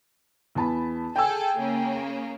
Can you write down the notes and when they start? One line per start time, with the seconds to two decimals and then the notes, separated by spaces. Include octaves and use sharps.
0.55 E2 A5 B5
1.16 G#4 A4 G5 G#5 E6
1.58 C#3 A#3